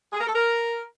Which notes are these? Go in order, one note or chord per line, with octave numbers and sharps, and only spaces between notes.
G#4
A#4
A4
A#4